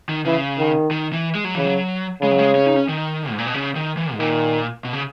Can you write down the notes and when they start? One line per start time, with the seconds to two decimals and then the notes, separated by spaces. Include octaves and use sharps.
0.09 D#3
0.25 C#3 E3
0.59 D#3
0.91 D#3
1.13 E3
1.35 G#3
1.44 F#3
1.55 C#3 E3
1.65 F#3
2.22 C#3 G#3
2.32 F#3
2.39 G#3
2.55 C#4
2.66 D#4
2.76 C#4
2.88 D#3
3.31 G#2
3.38 A#2
3.46 B2
3.54 C#3
3.75 D#3
3.97 E3
4.13 G#2
4.20 A#2 D#3
4.85 B2
4.93 C#3